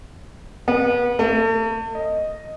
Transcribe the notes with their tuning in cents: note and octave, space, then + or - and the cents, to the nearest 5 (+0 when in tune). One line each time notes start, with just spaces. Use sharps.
B3 -30
A3 +40
D#5 +0